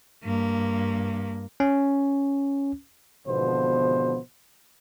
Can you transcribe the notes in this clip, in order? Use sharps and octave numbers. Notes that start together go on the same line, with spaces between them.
G2 A#3
C#4
G#1 B2 D3 F3 B3 C5